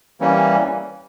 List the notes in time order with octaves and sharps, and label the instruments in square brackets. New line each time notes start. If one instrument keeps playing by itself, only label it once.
[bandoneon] E3 G3 A#3 C#4